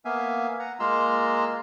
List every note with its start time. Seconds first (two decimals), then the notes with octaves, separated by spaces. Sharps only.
0.05 A#3 B3 E5 F5 G#5
0.59 F#5 A#5
0.80 G#3 A#3 F4 A#5 C6 E6